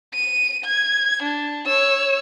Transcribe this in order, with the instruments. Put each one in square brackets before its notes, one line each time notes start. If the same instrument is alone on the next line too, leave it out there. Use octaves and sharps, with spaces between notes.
[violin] D#7
G#6
D4
C#5 E6